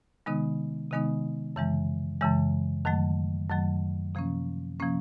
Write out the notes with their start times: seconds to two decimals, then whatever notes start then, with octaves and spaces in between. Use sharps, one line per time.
0.26 C3 D#3 G#3 B3 D#4
0.91 C3 D#3 G#3 B3 D#4
1.56 F#2 C#3 E3 G#3
2.21 F#2 C#3 E3 G#3
2.85 F#2 D#3 F#3 A3
3.50 F#2 D#3 F#3 A3
4.15 C3 F3 A#3 C#4
4.80 C3 F3 A#3 C#4